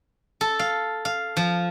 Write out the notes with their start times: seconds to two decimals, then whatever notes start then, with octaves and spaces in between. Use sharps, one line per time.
0.41 A4
0.59 F5
1.05 F5
1.37 F3